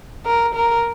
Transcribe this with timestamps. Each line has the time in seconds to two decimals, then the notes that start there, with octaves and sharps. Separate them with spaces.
0.26 A#4
0.55 A#4